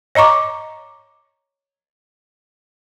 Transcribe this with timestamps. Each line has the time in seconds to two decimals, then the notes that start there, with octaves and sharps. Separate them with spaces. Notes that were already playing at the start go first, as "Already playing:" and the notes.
0.15 C#5 D#5 A#5 C#6 D6